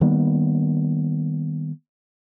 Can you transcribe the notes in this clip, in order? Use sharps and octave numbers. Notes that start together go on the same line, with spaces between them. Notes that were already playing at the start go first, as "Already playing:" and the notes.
D#3 G3 A#3 B3